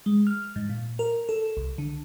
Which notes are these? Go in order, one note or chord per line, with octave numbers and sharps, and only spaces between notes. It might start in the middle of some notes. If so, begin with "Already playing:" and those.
G#3
F6
G#2
A#2
A#4
A4
C2
D3